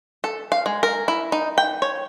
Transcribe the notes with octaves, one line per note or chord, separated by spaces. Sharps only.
A4
F5
G#3
A#4
E4
D#4
G5
C#5